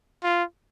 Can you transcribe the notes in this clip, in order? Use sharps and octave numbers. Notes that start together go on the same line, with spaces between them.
F4